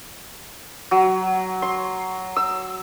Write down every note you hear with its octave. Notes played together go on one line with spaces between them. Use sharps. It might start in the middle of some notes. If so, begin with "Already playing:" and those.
F#3
C6
E6